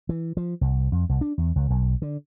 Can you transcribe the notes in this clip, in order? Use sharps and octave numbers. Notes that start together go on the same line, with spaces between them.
E3
F3
C2
F2
C2
D4
E2
C#2
B1
D3